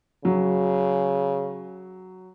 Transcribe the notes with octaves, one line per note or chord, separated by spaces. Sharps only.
C#3 F#3